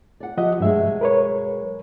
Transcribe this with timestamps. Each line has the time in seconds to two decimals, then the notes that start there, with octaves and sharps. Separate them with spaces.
0.20 D5 F#5
0.37 F3 G4 D#5 E5 F#5
0.60 G2 B2 F#3 G#3 E5
1.01 A#4 B4 C#5